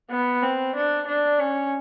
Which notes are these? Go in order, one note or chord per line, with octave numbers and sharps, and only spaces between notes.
B3
C4
D4
D4
C#4